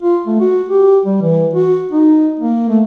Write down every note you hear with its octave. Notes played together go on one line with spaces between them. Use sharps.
F4
A3
F#4
G4
G3
E3
F#4
D#4
A#3
A3